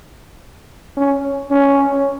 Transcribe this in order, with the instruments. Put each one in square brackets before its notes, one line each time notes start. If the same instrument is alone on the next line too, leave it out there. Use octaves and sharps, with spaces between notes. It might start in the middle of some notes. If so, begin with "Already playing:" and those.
[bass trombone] C#4
C#4